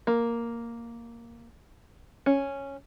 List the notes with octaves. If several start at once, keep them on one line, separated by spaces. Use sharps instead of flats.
A#3
C#4